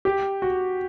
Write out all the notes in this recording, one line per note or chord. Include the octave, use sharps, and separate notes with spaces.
G4
F#4